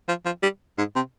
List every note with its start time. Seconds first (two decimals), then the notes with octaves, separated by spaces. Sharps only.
0.08 F3
0.25 F3
0.43 G3
0.78 G#2
0.96 C3